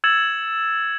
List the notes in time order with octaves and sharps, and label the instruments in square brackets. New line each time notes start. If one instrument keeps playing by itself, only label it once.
[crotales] E6 G#6 A6 C#7 E7 F#7